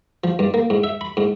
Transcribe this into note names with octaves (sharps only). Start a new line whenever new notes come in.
F3
G2
A#3
G#2
E5
B5
G#2